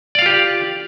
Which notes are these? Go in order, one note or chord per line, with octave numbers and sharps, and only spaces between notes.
F4 G4 D5 F5